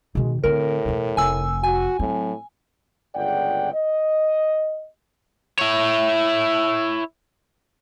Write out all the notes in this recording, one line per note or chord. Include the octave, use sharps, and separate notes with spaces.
B2 D#3 G#3
A2 D3 C4 A#4
E2 B2
F1 G#5 E6
F#4 G#5
A2 F#3 C4
G1 C#2 G#4 D5 F#5 G5
D#5
E4 C#5